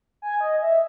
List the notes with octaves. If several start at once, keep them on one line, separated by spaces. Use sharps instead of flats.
G#5
D#5
E5